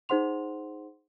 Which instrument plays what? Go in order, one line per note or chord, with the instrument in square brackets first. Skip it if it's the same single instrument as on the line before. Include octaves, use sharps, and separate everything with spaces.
[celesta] D#4 G#4 C5 F#5 C6 F7